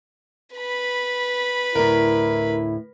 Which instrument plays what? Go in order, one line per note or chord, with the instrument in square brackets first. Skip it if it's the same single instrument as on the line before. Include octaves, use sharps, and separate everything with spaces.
[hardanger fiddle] B4 B5
[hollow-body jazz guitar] D2 A2 [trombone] E4 [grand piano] A#4